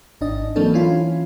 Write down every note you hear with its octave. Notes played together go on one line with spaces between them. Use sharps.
G#1 D4 D#5
E3 F#3 A#3 C4 D4 A4
E3 C#4 E4 F4